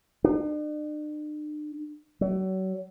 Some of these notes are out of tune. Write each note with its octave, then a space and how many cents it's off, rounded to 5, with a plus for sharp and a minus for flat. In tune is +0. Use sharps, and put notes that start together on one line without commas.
D4 +45
F#3 +35